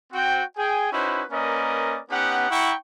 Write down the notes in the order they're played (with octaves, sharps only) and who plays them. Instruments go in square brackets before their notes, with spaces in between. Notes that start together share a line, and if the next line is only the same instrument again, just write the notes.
[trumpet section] C4 F#4 G5
G#4 G5 G#5
C#4 D#4 E4 F#4 B4 C5
A#3 C#4 A#4 B4 D5 D#5
B3 C#4 D#4 G4 F#5
E4 F#5 G5 A#5 C#6